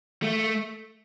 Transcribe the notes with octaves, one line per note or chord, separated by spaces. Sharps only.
A3